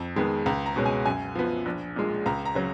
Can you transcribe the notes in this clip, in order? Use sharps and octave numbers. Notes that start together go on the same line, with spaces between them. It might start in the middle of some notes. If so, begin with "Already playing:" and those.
Already playing: F2
D#3 G#3 B3
C#2 A#5
A#5
B2 G#3 C#4
G#5
F#2 G#5
F3 B3
A#1
A#2 G#3
C#2 A#5
A#5
C#3 F#3